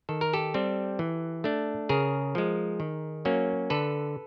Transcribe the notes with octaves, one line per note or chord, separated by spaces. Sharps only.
D#3 A4
A#4
G4 A4
G3 C4
E3
A3 D4
C#3 G#4 A#4
F3 G#3
D#3
F#3 A#3 C#4
D3 A4 B4